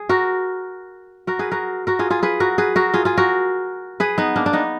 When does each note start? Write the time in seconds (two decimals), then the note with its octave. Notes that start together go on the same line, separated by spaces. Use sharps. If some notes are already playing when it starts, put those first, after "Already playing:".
Already playing: G#4
0.09 F#4 A#4
1.27 F#4 A#4
1.39 G#4 B4
1.52 F#4 A#4
1.87 F#4 A#4
1.99 F4 G#4
2.10 F4 G#4
2.23 G#4 B4
2.40 F#4 A#4
2.58 G#4 B4
2.76 F#4 A#4
2.94 F4 G#4
3.05 F4 G#4
3.17 F#4 A#4
4.00 G#4 B4
4.18 B3 D#4
4.36 A#3 D4
4.46 D4
4.53 B3 D#4